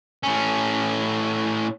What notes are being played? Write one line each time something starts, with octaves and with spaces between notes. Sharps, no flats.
A2 C#4